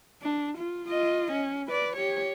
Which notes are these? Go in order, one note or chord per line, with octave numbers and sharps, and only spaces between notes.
D4
F4
F4 D#5
C#4
B4 D5
G4 C#5